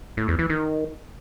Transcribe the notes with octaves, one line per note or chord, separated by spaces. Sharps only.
A2
E2
E3
D#3